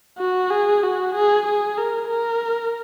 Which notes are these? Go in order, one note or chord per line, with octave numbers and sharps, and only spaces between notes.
F#4
G#4
F#4
G#4
G#4
A#4
A#4